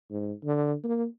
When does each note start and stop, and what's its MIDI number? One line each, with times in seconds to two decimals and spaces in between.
0.10 0.32 44
0.44 0.74 50
0.84 1.06 58